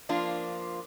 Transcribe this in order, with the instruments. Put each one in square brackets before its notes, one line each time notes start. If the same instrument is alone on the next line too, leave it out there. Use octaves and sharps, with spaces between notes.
[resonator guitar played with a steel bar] F3 A#3 D4 F4